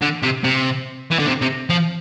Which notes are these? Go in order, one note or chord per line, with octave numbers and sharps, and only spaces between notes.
D3
C3
C3
E3
D3
C3
C3
F3